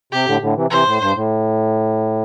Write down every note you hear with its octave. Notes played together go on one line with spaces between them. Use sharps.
C3 G4
A2 D3
A2 D3
C3 E3
C3 E3 C5
A2
G2
A2